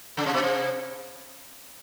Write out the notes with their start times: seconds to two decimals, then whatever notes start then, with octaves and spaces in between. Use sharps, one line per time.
0.17 C#3
0.26 C3
0.33 B2
0.42 C3